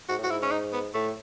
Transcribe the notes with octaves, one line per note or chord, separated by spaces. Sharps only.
G#2 F#4
A2
F#4
G#2 E4
C#4
D#4
B3
A2 A3